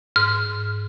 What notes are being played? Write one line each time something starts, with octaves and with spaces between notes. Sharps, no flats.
G#2 F6